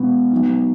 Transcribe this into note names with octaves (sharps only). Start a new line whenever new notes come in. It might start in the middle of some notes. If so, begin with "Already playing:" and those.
Already playing: B2 G#3 B3
F#3 B3 D#4